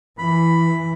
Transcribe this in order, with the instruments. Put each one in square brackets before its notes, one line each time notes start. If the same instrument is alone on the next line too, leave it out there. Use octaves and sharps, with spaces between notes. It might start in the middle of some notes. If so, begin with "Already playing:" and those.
[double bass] E3 [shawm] B5